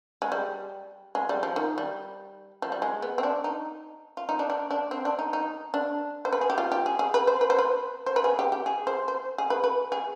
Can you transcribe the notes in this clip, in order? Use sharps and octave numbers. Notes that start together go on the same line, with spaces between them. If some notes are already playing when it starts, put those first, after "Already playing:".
G#3
G3
G#3
G3
F3
D#3
G3
F3
G3
G#3
B3
C4
D4
D#4
F4
D#4
D4
D4
D4
C4
D4
D#4
D#4
D4
C5
B4
G#4
G4
F4
G4
G#4
G#4
B4
C5
B4
C5
B4
C5
B4
G#4
G4
G4
G#4
C5
C5
G#4
B4
B4
G#4